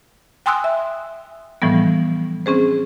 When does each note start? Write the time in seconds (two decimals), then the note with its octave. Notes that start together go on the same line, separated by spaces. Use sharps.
0.46 G5 G#5 C6 D#6 E6 F#6
0.64 E5
1.62 A2 E3 F3 G3 B3
2.46 C4 C#4 G#4 C5